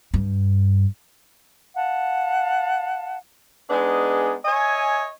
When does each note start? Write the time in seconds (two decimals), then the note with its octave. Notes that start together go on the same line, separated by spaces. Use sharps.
0.14 G2
1.75 F5 F#5 A5
3.70 G#3 B3 D4 D#4 G#4
4.45 C#5 D#5 E5 G#5